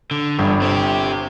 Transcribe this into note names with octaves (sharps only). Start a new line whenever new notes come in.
D3
G1 G2
C4 G4